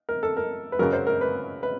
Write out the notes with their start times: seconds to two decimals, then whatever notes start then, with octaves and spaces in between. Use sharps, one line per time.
0.09 A#4
0.23 A4
0.37 A#4
0.72 B4
0.79 F#2 C#3 F#3 A#4
0.93 C5
1.07 A#4
1.21 B4
1.63 B4